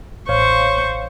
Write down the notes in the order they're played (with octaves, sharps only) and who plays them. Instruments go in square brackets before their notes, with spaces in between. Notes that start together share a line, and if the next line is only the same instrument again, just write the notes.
[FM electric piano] A1 C#5 F5 [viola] C5 C#6